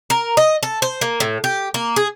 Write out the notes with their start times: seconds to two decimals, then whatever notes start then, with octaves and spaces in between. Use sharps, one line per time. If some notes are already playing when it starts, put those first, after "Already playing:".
0.10 A#4
0.37 D#5
0.63 A4
0.82 C5
1.01 A#3
1.20 A2
1.44 G4
1.74 A#3
1.96 G#4